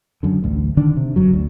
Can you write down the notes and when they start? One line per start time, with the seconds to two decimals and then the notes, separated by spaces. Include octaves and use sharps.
0.23 F#2 D3
0.42 A1 D2
0.77 D3 D#3 D4
0.97 C3
1.16 G1 F#2 F#3
1.33 D2